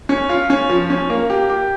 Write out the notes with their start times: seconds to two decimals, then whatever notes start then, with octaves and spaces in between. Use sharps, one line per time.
0.09 C#4
0.29 F4
0.50 C#4
0.69 F3
0.90 C#4
1.10 A#3
1.30 G4
1.50 G4